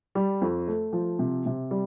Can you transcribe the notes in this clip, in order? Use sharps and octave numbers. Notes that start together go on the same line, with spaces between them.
G3
F2
A3
F3
C3
C3
G3